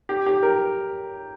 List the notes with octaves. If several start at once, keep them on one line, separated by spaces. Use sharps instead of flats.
G4
G4
A#4